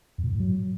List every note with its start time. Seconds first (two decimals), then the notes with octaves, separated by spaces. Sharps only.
0.18 F2
0.24 A#2
0.29 G2
0.34 A2
0.40 F#3